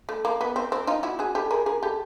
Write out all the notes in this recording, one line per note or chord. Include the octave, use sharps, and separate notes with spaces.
A3
A#3
B3
C4
C4
D#4 F4
E4 F#4
F#4 G#4
G4 A4
G#4 A#4
G#4 A#4
G4 A4